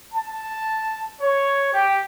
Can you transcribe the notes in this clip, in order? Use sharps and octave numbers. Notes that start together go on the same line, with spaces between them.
A5
C#5
G4